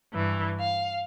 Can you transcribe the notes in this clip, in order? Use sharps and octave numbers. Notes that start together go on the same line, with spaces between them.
G2 E3
F5